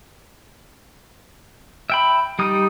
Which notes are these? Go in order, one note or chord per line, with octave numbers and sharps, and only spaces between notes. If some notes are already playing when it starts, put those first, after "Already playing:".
E5 G5 B5
G3 D#4 D#6